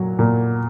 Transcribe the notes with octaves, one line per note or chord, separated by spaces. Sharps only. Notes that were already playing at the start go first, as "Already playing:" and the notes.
Already playing: A#2 F#3
A#2